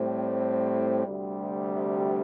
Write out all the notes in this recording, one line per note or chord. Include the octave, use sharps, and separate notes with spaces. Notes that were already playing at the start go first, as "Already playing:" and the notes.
Already playing: A2 G3 C4
D2 C3 G3